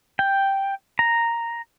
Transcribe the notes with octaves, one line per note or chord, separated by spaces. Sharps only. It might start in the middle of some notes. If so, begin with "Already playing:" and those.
G5
A#5